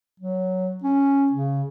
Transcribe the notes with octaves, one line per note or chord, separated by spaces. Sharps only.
F#3
C#4
C#3